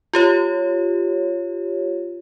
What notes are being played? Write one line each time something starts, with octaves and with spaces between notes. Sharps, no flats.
F4 G4 C#5